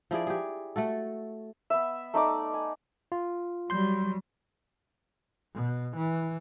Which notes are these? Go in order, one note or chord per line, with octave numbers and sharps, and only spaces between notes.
F3 E4 G#4 D5
G4 G#4
A3 F#4 A4
B3 E5
A3 D#4 D5 D6
G#5
F4
F#3 G3 C6 G6
B2
E3